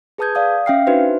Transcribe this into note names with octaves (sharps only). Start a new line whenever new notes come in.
G#4 B4 A5 D#6 G6 G#6
D5 F5 D#6
C#4 E5 F5 G5 F6 C7
D4 D#4 F#4 B4 C5 E5